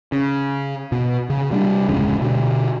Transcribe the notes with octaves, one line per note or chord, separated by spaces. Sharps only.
C#3
B2
C#3
C3 G3 A#3 D4
D1 F2 C#3 G#3
B2 D3